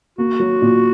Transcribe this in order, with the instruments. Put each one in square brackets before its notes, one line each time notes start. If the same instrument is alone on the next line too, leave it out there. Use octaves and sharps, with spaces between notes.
[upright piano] A#3 [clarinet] F#4
[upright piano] F#3
A#2